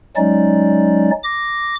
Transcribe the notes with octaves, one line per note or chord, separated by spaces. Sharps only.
F#3 G#3 C#4 D#4 D5
D6 A#6